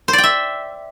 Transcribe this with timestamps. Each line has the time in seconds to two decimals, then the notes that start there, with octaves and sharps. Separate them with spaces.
0.08 C5
0.13 D5
0.18 G5
0.24 E5